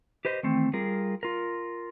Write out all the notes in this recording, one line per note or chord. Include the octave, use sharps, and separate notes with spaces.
G4 B4 C5 D#5
D#3 E3 A3 C4
G3 F4 G#4 A#4
F4 A#4